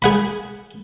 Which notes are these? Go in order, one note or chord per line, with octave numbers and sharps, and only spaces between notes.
G#4 F#5 B5